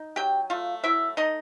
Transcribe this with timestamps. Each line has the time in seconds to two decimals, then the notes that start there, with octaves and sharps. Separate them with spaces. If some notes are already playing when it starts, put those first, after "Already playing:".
Already playing: D#4
0.16 F#3 G4 G5
0.50 A3 F4 F5
0.84 F#3 E4 E5
1.17 A3 D#4 D#5